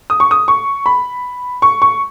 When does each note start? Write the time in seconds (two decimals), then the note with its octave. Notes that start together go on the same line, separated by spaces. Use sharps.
0.10 D#6
0.20 C#6
0.31 D#6
0.48 C#6
0.86 B5
1.62 C#6
1.82 C#6